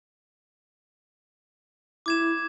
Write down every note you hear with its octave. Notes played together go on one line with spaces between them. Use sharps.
E4 D6 G#6 E7